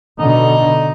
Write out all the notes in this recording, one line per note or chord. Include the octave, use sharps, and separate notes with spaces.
B2 D3 D#4